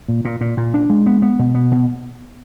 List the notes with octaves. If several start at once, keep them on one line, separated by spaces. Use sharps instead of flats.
A#2
A#2
A#2
A#2
D4
G#3
B3
B3
B2
B3
B2